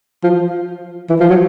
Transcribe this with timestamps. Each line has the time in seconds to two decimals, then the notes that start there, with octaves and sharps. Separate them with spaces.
0.24 F3
1.09 E3
1.20 F3
1.29 F#3